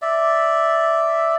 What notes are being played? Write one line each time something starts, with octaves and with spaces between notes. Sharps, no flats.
D5 E5